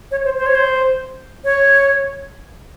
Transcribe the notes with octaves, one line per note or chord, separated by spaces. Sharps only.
C#5
C5
C5
C#5
C5
C#5